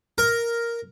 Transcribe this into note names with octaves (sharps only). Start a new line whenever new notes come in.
A#4